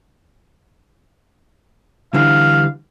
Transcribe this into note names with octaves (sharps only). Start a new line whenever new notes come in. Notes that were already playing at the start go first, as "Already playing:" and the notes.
D3 E3 G3 F5